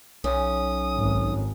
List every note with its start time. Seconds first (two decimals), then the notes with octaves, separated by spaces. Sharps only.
0.24 B1 C#4 D#6
0.96 G#1